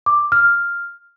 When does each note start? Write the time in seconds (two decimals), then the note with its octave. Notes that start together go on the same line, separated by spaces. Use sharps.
0.06 D6
0.32 F6